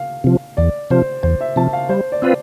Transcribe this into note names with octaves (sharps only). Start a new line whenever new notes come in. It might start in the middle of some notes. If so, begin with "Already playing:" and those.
Already playing: F5
C3 F3
E2 D5
C3 F3 C5
E2 C5
E5
C3 F3 A5
F5
G3 C5
D5
C4 F4 B4